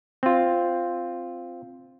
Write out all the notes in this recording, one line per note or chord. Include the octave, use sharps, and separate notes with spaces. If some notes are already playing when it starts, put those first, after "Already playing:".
C4 F4